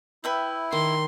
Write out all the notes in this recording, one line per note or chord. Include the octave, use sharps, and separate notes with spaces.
E4 B4 E5 G5
D#3 C6